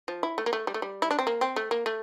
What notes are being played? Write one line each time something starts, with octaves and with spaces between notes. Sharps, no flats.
F3
E4
A3
A#3
A3
G3
A3
G3
E4
D4
C4
A#3
C4
A3
A#3
A3